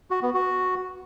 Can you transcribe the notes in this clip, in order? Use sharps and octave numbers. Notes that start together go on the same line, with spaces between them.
F#4
B3
F#4